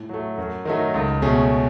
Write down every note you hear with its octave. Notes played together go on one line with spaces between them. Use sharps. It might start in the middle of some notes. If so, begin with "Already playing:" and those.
Already playing: A2
F#3 A3
F#2
D#3 F#3 A3 D#4
C#2
B2 A3 C#4 G#4